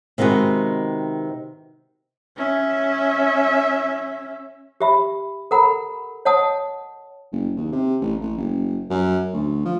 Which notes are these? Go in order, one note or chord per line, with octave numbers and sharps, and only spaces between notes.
C3 D#3 G#3 B3 F#4
C#4 E5
G4 E5 B5
A4 A#4 F#5 A#5 B5
C#5 D#5 F#5 A5 D#6
F#1
D#2
C3
A1
A1
F#1
F#2
D2
F3